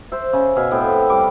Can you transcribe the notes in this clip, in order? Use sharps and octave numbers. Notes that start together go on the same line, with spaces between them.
C5 E5
C#3
B2 E5 F5 G#5
A2 B3 C4 G5
G3 D6